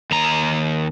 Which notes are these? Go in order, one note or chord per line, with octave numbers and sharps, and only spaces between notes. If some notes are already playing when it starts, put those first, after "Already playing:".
D#2 A#5